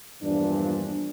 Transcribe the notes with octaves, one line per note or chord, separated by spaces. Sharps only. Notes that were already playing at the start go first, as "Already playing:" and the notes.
E2 G2 A#2 E3 F3 D4